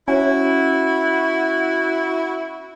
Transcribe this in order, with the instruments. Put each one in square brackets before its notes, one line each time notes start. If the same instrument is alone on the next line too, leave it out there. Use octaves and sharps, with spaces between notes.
[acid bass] C#4 [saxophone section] E4 F#4